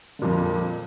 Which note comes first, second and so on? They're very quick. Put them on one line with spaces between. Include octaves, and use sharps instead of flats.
D3 A#2 F2